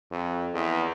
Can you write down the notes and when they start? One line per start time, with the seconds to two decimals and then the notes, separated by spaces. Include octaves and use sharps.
0.12 F2
0.54 E2